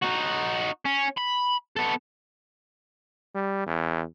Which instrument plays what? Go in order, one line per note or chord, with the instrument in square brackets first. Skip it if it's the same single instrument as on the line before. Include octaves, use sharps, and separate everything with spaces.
[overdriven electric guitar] D#4 F#4
C#4
B5
B3 A4
[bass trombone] G3
E2